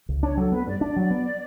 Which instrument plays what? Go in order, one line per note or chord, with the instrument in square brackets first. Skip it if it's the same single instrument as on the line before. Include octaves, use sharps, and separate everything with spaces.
[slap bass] C#2
[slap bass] D4 [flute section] C#5
[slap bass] F#3 [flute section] A4
[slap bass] B3 [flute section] B4
[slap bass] G2 [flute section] D5
[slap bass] D4 [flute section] D5
[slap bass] F#3
B3